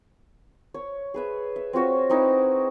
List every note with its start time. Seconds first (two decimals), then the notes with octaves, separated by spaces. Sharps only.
0.74 C#5
1.14 G#4 B4 E5
1.56 E5
1.73 C4 F4 F#4 C#5
2.10 C4 D#4 E4 B4